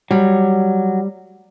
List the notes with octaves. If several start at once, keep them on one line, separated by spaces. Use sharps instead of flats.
F#3 G3